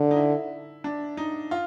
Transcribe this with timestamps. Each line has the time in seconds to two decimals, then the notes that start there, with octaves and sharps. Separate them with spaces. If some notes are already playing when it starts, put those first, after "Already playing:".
Already playing: D3
0.11 D#4
0.17 E4
0.84 D4
1.17 D#4
1.51 F4